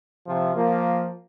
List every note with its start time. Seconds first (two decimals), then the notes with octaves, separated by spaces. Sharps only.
0.27 C3 F3
0.56 F3 A#3